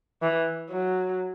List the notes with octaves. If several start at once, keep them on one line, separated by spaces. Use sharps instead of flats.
E3
F#3